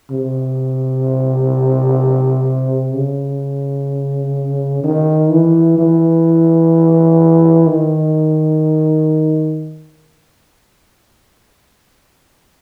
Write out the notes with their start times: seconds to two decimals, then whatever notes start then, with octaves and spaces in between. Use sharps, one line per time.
0.11 C3
2.95 C#3
4.84 D#3
5.31 E3
5.78 E3
7.67 D#3